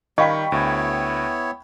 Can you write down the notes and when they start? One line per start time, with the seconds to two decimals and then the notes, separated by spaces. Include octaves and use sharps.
0.18 D#3 G3 D#5 F5 G5 B5 C#6 B6
0.52 D2 B3 E4 C#5